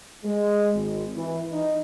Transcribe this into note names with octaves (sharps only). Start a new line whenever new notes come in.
G#3
G#1
E3
D#4